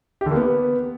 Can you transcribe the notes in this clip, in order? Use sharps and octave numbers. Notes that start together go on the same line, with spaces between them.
G4
D3
A#3
B3